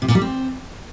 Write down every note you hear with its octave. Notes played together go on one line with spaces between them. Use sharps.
C3
A#2
G3
C4